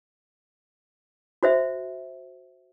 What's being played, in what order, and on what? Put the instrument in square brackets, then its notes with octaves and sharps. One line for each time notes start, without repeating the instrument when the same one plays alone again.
[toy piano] F#4 C5 E5